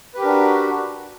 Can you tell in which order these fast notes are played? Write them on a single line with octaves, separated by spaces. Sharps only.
B4 G4 A#4 D4 F#4